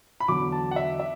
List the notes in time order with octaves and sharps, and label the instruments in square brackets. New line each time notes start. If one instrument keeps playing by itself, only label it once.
[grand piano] B5
E2 D3 F#3 D6
A5
F#5
E5
E5